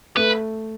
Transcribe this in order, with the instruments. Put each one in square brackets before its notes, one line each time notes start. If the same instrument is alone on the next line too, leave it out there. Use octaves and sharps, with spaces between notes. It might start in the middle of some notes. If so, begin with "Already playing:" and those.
[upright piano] A3 [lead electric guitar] B4